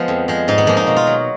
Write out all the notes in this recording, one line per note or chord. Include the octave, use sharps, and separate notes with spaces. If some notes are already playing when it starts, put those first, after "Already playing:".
Already playing: F3 G#3 B3
F2
F3 G#3
G#2 D#4
B3
F3 G#3 A#3
D#4
B2
F4
F#3